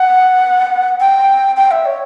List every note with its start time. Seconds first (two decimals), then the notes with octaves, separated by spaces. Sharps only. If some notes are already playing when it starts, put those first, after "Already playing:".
Already playing: F#5
1.00 G5
1.57 G5
1.71 E5
1.86 C#5